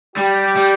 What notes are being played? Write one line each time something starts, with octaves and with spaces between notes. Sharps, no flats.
G3 G4
G3